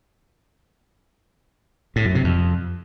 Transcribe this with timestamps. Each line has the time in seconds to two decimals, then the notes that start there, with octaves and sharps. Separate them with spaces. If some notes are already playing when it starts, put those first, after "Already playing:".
1.96 A2
2.05 F#2
2.15 C3
2.24 F2